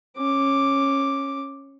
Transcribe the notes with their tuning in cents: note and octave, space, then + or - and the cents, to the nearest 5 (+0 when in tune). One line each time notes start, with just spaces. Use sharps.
C#4 -15 D6 +0